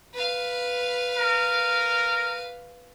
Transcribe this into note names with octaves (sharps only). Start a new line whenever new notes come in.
B4 F5
A#4